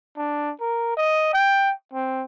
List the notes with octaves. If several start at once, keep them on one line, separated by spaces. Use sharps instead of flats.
D4
A#4
D#5
G5
C4